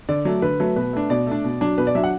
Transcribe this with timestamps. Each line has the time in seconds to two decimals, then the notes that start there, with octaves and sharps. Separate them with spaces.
0.09 D3 D5
0.25 F#3 A3
0.42 D3 B4
0.60 F#3 A3
0.76 B2 B4
0.93 A3 D4
1.10 B2 D5
1.27 A3 D4
1.44 B2
1.61 F#3 D4
1.78 B2 B4
1.87 D5
1.95 F#3 D4 E5
2.04 F#5